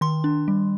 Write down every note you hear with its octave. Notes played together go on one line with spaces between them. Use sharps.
D#3 C6
D4
G3